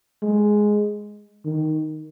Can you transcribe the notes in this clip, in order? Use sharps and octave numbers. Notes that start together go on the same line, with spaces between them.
G#3
D#3